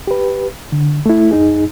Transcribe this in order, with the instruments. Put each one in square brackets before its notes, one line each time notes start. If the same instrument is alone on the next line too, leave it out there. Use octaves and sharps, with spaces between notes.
[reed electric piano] G4 B4
D3
A3 E4
F#2 D#4 G#4